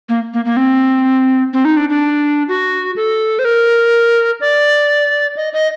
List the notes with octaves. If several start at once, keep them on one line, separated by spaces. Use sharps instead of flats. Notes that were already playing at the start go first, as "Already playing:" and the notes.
A#3
A#3
A#3
C4
C4
D#4
D4
D4
F#4
A4
C5
A#4
D5
D#5
D#5